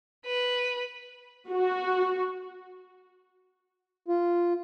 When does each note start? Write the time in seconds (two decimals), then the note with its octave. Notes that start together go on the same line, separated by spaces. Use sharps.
0.25 B4
1.50 F#4
4.08 F4